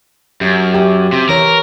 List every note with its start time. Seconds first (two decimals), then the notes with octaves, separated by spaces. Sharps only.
0.41 F#2 G4
0.74 G4
1.12 C3
1.29 E3 A#4 C#5